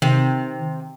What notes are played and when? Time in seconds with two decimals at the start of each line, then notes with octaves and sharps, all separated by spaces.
0.02 C3 D#3